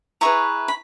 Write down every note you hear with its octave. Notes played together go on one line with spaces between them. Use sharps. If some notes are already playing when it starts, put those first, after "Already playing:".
E4 G#4 B4 A#5 C#6
B5